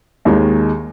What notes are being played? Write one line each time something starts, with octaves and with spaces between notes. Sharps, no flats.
D#2 D#3 G#3